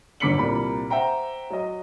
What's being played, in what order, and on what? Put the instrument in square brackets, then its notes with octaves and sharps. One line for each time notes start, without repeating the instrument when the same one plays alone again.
[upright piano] G1 D3 D6 B6 C#7 F#7
C2 A#2 A#3 B5
C5 E5 F#5 G5 A#5
F#3 D#5